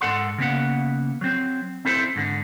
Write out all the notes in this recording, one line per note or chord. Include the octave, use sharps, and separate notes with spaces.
G#2 A4 F#5 C6
C#3 A#3 B3 F#5
F#3 C4
C4 E4 A4 C5
G#2 D3